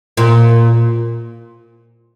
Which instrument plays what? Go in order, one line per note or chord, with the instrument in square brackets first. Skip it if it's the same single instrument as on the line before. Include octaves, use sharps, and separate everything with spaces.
[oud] A#2